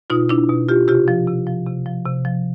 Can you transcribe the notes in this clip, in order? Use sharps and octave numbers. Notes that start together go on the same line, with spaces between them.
B2 D#4 F4
D4 E4
B2
F4 G4
C3 F4 G4
F3
C3
F3
C3
F3
C3
F3